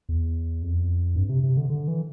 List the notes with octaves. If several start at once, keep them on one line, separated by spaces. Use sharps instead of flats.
E2
F2
G2
C3
C3
D3
D3
E3